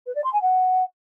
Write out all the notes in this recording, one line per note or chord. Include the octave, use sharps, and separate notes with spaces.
B4
D5
C6
G#5
F#5